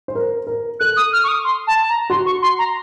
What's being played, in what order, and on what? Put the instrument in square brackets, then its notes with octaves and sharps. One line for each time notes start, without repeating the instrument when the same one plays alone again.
[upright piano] C5
A#4
A#4
[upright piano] A4 [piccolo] F#6
[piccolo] D#6
F6
C#6
D#6
C6
A5
A#5
[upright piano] F#4 [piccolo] C6
[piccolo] C#6
C6
A#5